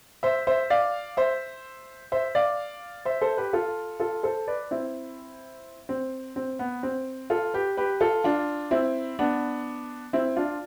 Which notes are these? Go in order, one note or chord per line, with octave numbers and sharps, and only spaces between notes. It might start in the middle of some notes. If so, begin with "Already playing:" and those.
C5 E5
C5 E5
D5 F5
C5 E5
C5 E5
D5 F5
C5 E5
A4 C5
G4 B4
F4 A4
F4 A4
A4 C5
B4 D5
C4 E4
C4
C4
B3
C4
F4 A4
G4 B4
G4 B4
F4 A4
D4 F4
C4 E4
B3 D4
C4 E4
D4 F4